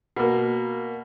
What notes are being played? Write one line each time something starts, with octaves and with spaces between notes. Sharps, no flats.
B2 A#3